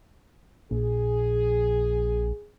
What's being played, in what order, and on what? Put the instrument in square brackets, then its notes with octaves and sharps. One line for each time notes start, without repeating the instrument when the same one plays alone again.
[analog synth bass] A#1 [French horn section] G#4